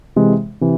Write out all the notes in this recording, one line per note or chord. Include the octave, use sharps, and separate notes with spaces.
C3 E3 G#3
C3 E3